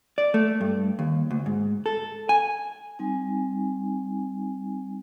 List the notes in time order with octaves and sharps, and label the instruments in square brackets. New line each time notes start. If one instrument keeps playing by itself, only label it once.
[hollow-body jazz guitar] D5
A3
G2
D#2
D2
G#2
A4
G#5
[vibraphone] G3 C4 D#4 G#5